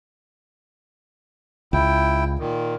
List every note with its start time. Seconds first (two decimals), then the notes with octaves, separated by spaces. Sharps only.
1.73 C#2 E4 G5
2.39 A#2 D#3